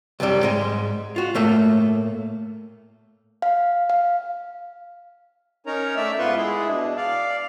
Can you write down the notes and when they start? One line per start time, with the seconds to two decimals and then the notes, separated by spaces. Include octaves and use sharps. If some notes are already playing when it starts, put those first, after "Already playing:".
0.20 C2 F#2 C3 G3
0.43 G#2 G#3
1.16 F4 F#4
1.35 A2 A3 A#3
3.42 F5
3.90 F5
5.66 C#4 D#4 A#4 C#5 A#5
5.97 A3 D5 E5 E6
6.19 G#2 B3 F4 B4 C6 C#6
6.36 G#3 E4 G#4
6.68 B2 D4
6.97 D5 F5